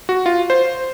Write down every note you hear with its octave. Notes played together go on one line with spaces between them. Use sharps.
F#4
F4
C5